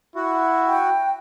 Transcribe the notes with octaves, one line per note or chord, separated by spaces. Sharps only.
E4 F#4
G5